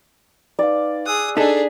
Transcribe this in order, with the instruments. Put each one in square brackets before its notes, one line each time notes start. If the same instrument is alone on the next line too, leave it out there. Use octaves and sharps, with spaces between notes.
[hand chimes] D#4 B4 F5 [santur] D5
[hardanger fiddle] G#4 D#6 [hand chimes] G#5 E6 F#6
[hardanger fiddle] D4 G#4 [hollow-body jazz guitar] D#4 A4 [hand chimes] B6